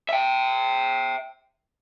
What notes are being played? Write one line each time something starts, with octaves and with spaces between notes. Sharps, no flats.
E5 G5